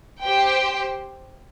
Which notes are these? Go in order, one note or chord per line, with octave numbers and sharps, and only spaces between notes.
G4 C5 G5